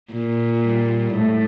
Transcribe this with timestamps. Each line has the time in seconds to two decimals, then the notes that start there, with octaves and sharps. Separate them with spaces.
0.12 A#2
0.64 G3
1.16 A2 A3